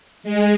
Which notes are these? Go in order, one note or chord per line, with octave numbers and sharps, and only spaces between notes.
G#3